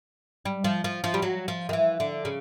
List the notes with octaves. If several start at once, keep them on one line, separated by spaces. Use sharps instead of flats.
G3
F3
F3
F3
G3
F#3
F3
D#3
E3
D3
C#3